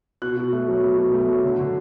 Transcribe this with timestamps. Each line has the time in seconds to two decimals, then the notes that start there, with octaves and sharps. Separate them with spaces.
0.22 B2 F#6
0.37 B2
0.53 A3
0.68 F#3
0.83 B2
0.98 B2
1.13 A3
1.29 F#3
1.44 D3
1.59 D3